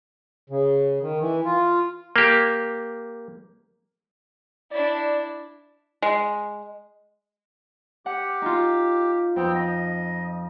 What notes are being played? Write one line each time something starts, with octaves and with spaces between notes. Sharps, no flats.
C#3
D#3
E3
F4
A#3 G4
D4 E4 D5
G#3
G4 F#5
D#4 F4
F2 B3 C4 G5
D#5